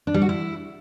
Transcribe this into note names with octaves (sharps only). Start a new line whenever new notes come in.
D4
G3
F#4
E4